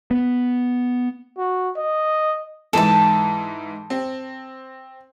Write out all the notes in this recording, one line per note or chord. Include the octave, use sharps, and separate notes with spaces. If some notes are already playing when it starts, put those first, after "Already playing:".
B3
F#4
D#5
G#2 E3 D#4 A4 A5
C4